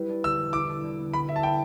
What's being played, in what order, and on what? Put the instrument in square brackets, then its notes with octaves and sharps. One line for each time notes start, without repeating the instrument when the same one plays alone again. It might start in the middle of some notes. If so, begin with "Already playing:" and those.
Already playing: [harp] G3 E4 G4 B4
D4
[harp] D3 [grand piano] E6
[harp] E1
[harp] E4 [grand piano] D6
[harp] A4
D3
B3
[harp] G3 [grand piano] B5
[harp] E4 [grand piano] E5
[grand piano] A5
[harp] D4 [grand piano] G5